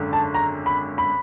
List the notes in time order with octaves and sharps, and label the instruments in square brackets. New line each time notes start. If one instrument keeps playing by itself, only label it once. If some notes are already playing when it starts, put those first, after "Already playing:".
Already playing: [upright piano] G#1 F#2 D3
A5
A#5
B5
B5